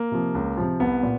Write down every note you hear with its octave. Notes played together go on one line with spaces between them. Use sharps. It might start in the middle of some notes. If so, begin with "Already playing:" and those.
Already playing: A#3
C3 F3
C#2
C3 F3
C2 B3
A#2